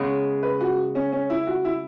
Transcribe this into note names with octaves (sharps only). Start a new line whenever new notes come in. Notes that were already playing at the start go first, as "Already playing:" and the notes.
Already playing: C#3 G#3 B3 C#5
B4
F#4
C#4
C#4
E4
F#4
E4